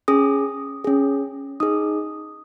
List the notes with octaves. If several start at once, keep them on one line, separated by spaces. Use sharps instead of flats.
C#4 G#4 D#6
C#4 G#4
D#4 G#4 D#6